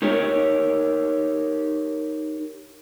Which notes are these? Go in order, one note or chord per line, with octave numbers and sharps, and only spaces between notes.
D#4 G4 A#4 C#5